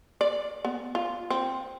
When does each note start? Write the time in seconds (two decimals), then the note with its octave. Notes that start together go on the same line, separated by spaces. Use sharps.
0.21 D5
0.65 B3
0.95 F4
1.31 C4